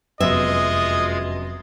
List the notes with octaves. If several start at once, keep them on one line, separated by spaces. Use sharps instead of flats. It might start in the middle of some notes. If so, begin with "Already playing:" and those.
F1 F#2 G#3 B3 F4 D#5 E5 G#6